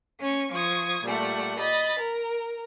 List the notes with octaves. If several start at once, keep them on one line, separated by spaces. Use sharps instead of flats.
C#4 C#6
F3 C#6 D#6 G#6
A#2 G3 A3 F#5
D#5 B5 A6
A#4